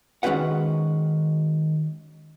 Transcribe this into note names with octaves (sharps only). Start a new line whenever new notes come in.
D#3 G#3 C#4 F#4 B4 F#5